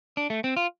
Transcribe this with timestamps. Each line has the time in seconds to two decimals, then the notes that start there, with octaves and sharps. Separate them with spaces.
0.17 D4
0.30 A3
0.44 C4
0.57 F4